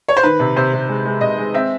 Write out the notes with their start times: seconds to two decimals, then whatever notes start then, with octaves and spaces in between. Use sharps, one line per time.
0.08 C#5
0.17 C5
0.23 D#3 B4
0.40 C3
0.56 C3 C5
0.73 C3
0.88 G#3
1.05 G#3
1.21 C3 D#5
1.38 G#3
1.54 C4 E5